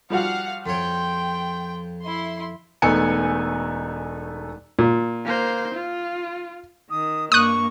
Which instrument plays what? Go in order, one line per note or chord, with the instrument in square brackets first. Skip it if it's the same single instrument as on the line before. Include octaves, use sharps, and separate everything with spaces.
[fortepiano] F3 G3 F#4 [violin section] F5 F#5
[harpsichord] F2 C#5 [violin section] G5 [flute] C6
[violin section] E4 C6
[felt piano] E1 A3 B3 D#4 G#5 C#7
[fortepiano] A#2
[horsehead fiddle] A#3 C5
F4
[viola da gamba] D#3 [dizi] D#6
[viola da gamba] G2 A#3 [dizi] C#6 [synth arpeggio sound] D#6 F#6